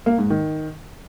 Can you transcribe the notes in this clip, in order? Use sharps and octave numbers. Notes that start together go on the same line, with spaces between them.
A#3
G#2
D#3